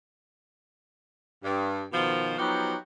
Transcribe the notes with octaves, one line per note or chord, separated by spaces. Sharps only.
G2
B2 D#3 F3
F3 F#3 B3 D#4 F#4 G4